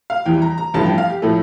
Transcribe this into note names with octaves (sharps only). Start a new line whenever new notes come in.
F5
E2 E3 G3 G5
A#5
A#5
A1 G2 F3 A3 A5
G5
F5
G4
A2 F3 A3 A4